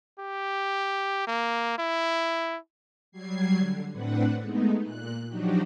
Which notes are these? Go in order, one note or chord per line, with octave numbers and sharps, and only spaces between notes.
G4
A#3
E4
F#3 G3 G#6 C7
D3
A2 C4 D4 B4 F#5
G#3 A3 B3 D#4
A#2 F#6
F3 F#3 D4 D#4 F#4 G4